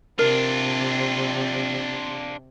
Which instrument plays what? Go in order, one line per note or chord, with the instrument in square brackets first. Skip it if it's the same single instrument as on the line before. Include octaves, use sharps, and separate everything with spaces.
[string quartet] C3 C4 [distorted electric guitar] D4 F4 [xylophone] A#4